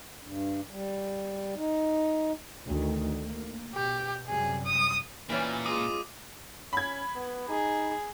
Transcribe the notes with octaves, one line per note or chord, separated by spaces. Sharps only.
G2
G3
D#4
D2 D#3
A#3
B2 G4
F#2 C3 G3 G#4
D#6
A#2 E3 G3 C#4
G#3 F4 D#5 D6 D#6 D#7
C#4 B5 G#6
B3
D#4 G#4